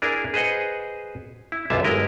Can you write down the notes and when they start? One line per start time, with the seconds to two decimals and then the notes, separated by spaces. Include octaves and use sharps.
0.02 D4 E4 G#4 A#4
0.34 G#4 B4 C5 D#5 F#5
1.52 E4
1.70 B1 F#2 D3 F4 E5 A5
1.84 G1 G#3 E4 A#4 D#5